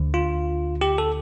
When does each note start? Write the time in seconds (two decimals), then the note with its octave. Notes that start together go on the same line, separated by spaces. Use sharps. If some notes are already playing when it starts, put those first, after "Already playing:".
Already playing: D2 D3
0.14 F4
0.81 G4
0.98 A4